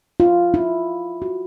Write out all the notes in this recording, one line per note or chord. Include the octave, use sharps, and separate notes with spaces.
F4
E4
F#4